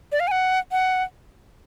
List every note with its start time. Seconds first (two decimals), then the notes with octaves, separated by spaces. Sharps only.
0.12 D5
0.20 F5
0.27 G#5
0.31 F#5
0.72 F#5